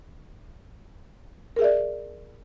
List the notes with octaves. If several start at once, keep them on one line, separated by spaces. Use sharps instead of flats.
G#4 A#4 D5 E5